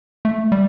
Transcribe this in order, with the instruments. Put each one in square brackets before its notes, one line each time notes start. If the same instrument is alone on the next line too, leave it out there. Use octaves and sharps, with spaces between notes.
[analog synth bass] A3
G3